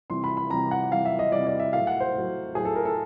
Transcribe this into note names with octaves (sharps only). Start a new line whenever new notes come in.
C3 E3 G3 C6
B5
B5
C3 E3 G3 A#5
F#5
C3 E3 G3 F5
E5
D#5
C3 E3 G3 D5
D5
E5
A2 F#3 F5
F#5
C5
A2 F#3
A2 F#3 G#4
A4
A#4
A4